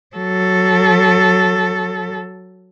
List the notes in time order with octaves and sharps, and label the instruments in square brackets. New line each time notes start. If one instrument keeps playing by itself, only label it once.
[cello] F#3 A4